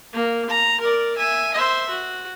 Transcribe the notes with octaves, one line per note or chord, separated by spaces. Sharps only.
A#3
A#5
A#4 D5
E5 G#5
C5 E5
F#4